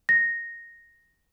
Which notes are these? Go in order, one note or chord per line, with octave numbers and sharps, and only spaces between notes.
A#6